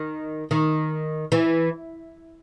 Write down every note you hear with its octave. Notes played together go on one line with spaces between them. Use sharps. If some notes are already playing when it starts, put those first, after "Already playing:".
Already playing: D#3
D#3
E3